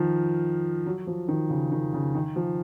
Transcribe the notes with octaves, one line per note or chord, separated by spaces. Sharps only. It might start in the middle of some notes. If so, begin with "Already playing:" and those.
Already playing: D#3 F3
F#3
F3
D#3
C#3
D#3
C#3
D#3
F3